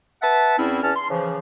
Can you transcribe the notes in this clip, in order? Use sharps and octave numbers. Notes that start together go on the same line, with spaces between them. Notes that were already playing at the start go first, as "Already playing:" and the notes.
B4 E5 F#5 A5
E2 C4 C#4 E4
E2 C#4 A5 F6
C6
C#3 E3 F3